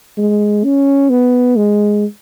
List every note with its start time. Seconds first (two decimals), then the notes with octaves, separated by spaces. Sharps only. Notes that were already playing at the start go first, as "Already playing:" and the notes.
0.17 G#3
0.64 C#4
1.10 B3
1.57 G#3